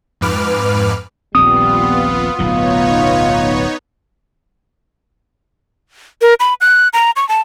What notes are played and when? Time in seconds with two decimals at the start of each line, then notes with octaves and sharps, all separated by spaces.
0.21 F2 G#2 B4 D6 F6
1.35 D#1 A#1 G3 B3 C4 F4 D#6
2.39 D1 B1 B2 B3 D#4 F4 C#5
6.22 A#4
6.40 B5
6.61 F#6
6.93 A#5
7.16 C#6
7.29 A5